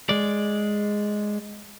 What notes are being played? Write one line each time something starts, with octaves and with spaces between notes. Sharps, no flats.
G#3 D5